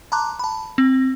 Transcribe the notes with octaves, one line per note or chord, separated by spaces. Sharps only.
A5 A#5 C6 D6 F#6
A5 B5
C4